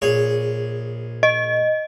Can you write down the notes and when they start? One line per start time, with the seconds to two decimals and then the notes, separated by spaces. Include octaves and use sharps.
0.02 A#1 G#4 C#5
1.23 D#5